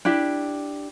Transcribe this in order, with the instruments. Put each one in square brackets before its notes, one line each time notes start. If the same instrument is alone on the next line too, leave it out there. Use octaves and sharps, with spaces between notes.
[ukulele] D4 E4 G4